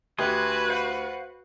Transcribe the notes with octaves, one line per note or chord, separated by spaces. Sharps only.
D2 F#4 G4 B4 G#5 C6 D#6
C5 F5 F#5